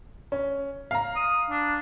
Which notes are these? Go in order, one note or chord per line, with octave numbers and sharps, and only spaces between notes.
C#4
F5 A#5
D#6
D4